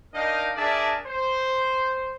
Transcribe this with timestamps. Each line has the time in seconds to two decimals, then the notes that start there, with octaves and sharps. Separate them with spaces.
0.13 D4 D#4 A#4 D#5 F5 G5
0.56 D4 G#4 A#4 D5 E5 A5
1.06 C5